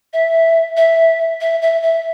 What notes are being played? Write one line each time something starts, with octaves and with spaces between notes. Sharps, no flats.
E5
E5
E5
E5
E5